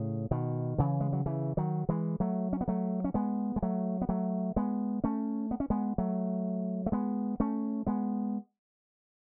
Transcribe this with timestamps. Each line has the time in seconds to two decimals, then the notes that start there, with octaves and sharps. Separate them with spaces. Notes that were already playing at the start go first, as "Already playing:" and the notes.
Already playing: A2 C#3
0.31 B2 D#3
0.78 C#3 E3
1.00 G#3
1.13 F#3
1.26 C#3 E3
1.57 D#3 F#3
1.89 E3 G#3
2.20 F#3 A3
2.53 C#4
2.61 B3
2.68 F#3 A3
3.04 C#4
3.14 G#3 B3
3.56 G#3
3.62 F#3 A3
4.01 B3
4.09 F#3 A3
4.56 G#3 B3
5.04 A3 C#4
5.51 B3
5.60 C#4
5.70 G#3 B3
5.98 F#3 A3
6.86 A3
6.92 G#3 B3
7.40 A3 C#4
7.87 G#3 B3